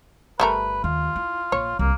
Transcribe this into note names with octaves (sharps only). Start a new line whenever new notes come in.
G1 G3 A3 A#4 B4
D#2 F4
E4
A#1 C#5
C2 A#3